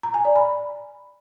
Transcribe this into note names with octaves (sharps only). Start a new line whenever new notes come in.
A#5
G#5
D5
B5